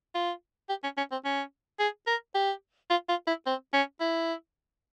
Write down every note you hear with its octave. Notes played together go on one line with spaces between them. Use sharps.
F4
G4
C#4
C#4
C4
C#4
G#4
A#4
G4
F4
F4
E4
C4
C#4
E4